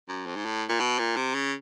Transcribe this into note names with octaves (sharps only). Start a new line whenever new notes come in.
F#2
F2
G#2
A2
A#2
B2
A#2
C3
C#3